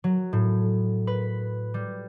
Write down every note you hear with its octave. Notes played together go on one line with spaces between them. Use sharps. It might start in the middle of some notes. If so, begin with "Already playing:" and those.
F#3
A2
B4
G3